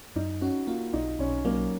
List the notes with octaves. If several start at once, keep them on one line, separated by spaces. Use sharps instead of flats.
F#2 D#4
C#4 F#4
A#3 F4
B1 D#4
B1 C#4
F#3 A#3